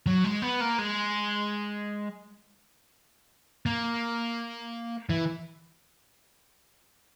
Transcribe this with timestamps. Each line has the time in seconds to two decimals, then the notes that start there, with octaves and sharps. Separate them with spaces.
0.06 F#3
0.24 G#3
0.42 B3
0.61 A#3
0.78 G#3
3.66 A#3
5.09 E3